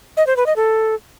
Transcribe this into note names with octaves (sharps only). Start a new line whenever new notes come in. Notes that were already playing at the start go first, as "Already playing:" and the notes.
D#5
C5
B4
D#5
A4